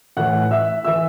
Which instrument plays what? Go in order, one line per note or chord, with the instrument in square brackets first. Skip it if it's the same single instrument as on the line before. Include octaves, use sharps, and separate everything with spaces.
[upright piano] A2 E3 F#5 F#6
E5 E6
E3 E5 E6